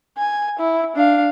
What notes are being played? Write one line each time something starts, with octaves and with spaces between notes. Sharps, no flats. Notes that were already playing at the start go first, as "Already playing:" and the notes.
G#5
E4
D4 F5